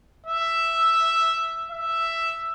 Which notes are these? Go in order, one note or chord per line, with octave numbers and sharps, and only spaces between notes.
E5
E5